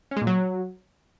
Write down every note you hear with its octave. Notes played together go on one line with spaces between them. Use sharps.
C#4
G#3
A#2
F#3